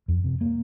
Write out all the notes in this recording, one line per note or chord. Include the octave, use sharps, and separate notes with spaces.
F2
C3
A#3